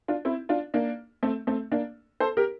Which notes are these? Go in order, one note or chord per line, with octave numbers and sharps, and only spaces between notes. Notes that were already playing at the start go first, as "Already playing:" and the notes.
D4 F4
C4 E4
D4 F4
A#3 D4
A3 C4
A3 C4
A#3 D4
A4 C5
G4 A#4